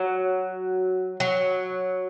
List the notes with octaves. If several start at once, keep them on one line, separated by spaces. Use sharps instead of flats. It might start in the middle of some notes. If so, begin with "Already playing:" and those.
Already playing: F#3
F#3